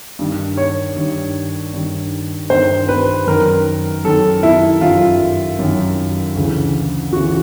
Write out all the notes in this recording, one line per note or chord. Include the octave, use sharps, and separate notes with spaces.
G2 D#3
C#5
G2 D#3
G2 D#3
G2 D#3 C5
B4
F#2 D#3 A#4
F#2 D#3 A4
E4
F#2 D#3 F4
F#2 D#3
D2 C#3 E3
D2 C#3 E3 F#4